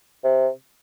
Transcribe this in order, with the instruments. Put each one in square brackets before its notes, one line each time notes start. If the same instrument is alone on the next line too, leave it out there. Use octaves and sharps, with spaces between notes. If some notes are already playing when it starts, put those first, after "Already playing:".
[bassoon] C3